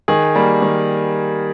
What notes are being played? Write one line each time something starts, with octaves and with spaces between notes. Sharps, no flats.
D#3 G#4
G3 A#3
D#3